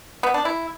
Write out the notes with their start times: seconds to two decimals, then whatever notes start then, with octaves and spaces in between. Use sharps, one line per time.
0.23 B3
0.34 D4
0.45 E4